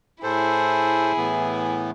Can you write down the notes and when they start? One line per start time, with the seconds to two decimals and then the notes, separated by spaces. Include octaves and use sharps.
0.23 A2 E4 G#4 A4 C5
1.17 A2 E3 B3